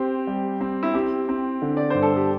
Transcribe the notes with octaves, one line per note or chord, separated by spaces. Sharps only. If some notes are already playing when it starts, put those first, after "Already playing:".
Already playing: C4 G4 C5
G3
C4
E4
C4 G4
C4
D3
D5
G2 C5
A4
G4